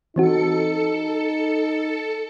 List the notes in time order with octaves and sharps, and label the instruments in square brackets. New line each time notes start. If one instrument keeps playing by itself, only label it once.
[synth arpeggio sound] E3 C4 F#4 [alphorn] D#4 [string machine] A4 C#7